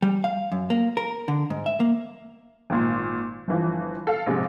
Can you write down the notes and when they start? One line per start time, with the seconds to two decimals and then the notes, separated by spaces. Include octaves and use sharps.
0.02 G3
0.24 F5
0.52 F#2
0.70 A#3
0.97 A#4
1.28 D3
1.50 G#2
1.66 E5
1.80 A#3
2.70 G#1 A#2 C6
3.48 G1 E3 F3
4.07 A4 F5
4.26 A#1 G#2 C3 G#3